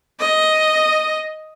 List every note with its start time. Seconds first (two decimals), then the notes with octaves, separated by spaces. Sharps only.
0.20 D#5